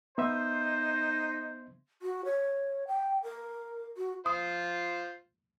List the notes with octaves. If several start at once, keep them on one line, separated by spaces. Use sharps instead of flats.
B3 D#4 C5 E5
F#4
C#5
G5
A#4
F#4
F4 C5 D#6